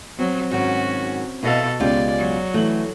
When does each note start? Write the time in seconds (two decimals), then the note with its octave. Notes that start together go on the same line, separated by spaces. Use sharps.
0.19 F#3 C4
0.51 G#2 D#3 F#3 C#4 F#4
1.43 B2 E4 A4 D#5 F5
1.80 C#2 B3 C#4 F4 G4 D5
2.18 F#3
2.54 E3 A3 F#7